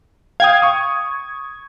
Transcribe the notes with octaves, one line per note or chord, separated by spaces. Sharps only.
F5 G5 D#6 G#6
C#6 D#6